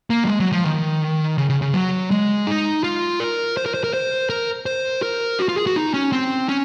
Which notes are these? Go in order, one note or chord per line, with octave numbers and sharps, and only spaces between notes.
A#3
F#3
G#3
F#3
F3
D#3
C#3
C#3
C#3
F#3
G#3
D#4
F4
A#4
C5
A#4
C5
A#4
C5
A#4
C5
A#4
F#4
F4
G#4
F#4
D#4
C#4
C4
C#4